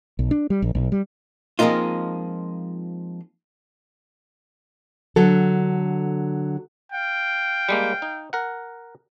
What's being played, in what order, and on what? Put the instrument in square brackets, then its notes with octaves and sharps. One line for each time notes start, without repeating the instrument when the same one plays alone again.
[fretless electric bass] B1
D4
G3
A#1
B1
G3
[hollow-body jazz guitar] F3 G#3 A#3 C4 D#4 F4
[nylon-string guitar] D3 F#3 A4
[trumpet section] F5 G5
[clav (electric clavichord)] G3 G#3 A#3
D#4
A#4 F#5